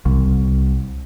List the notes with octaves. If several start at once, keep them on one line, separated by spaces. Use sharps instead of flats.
C2